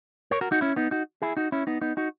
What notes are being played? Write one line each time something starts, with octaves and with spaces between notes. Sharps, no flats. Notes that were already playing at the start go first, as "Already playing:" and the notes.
A#4 C#5
F#4 A#4
D#4 F#4
C#4 E4
B3 D#4
D#4 F#4
E4 G#4
D#4 F#4
C#4 E4
B3 D#4
B3 D#4
D#4 F#4